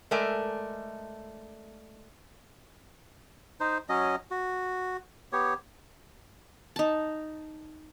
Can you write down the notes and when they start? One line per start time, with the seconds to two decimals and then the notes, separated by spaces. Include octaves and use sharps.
0.11 G#3 A3 A#4 D5 E5 G#5
3.60 D#4 C5
3.89 F#3 C#4 D#5
4.31 F#4
5.32 B3 G4 C#5
6.76 D#4 A5